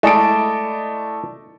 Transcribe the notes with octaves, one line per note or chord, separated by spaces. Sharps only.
G#3 A3 E4 D5 D#5 A5 D7